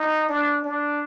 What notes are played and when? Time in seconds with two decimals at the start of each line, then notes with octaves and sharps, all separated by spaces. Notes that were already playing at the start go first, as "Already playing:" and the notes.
Already playing: D#4
0.29 D4
0.65 D4